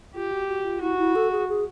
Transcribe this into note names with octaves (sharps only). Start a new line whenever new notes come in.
F4 G4
F#4
F#4
F4
E4 F#4
E4
A4
G#4
G#4